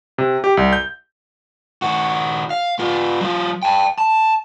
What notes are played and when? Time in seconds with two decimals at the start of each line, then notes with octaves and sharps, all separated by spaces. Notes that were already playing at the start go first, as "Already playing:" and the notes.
0.18 C3
0.44 G4
0.57 C2
0.73 G6
1.82 D#3 F#4
2.50 F5
2.79 B3 F4
3.21 F#3 F4
3.63 G5 A5
3.98 A5